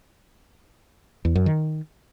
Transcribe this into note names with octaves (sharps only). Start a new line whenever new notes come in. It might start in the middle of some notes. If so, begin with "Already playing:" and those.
E2
F#2
D#3